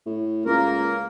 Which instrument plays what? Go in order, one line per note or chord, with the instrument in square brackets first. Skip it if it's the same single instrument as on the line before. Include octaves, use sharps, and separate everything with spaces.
[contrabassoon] A2
[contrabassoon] C#2 [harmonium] A#3 A#4